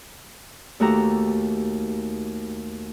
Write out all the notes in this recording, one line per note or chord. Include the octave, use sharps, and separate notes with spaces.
D#2 A3 F#4 G4 A4 A#5